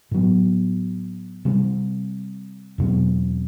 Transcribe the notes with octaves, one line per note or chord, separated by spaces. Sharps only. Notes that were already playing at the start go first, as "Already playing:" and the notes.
A2 F#3 B3
C3 G3 C4
E2 B2 F#3 C4